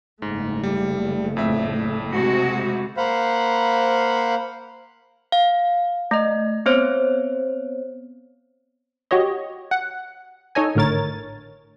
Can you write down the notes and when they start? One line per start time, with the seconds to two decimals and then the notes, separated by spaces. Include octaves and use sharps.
0.22 F#1 G#2 A3
0.63 G3
1.37 F2 A2 E5
2.12 C3 G#3 F#4
2.97 A#3 C5 F5 F#5 B5
5.32 F5
6.11 A3 D#5
6.66 B3 C4 C5 C#5
9.11 F#4 G4 C#5 D#5
9.71 F#5
10.55 D#4 A4 C#5 D#5 G#5
10.75 G#1 A2 D3 A#4 C#5 A6